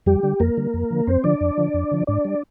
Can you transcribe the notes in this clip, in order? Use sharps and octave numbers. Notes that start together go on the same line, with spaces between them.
F2 G3 G4
D3 G3
F2 A#3 A#4
D3 G3
F2
D3 F3
F2 C4 C5
D3 F3 D4 D5
F2
D3 F3
F2
D3 F3
G#2 D4 D5
G3